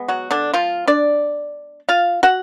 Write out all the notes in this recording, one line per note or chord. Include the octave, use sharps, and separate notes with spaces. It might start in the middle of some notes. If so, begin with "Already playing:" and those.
Already playing: G#3 B3
F#3 F#4
D3 D4
F3 F4
D4 D5
F4 F5
F#4 F#5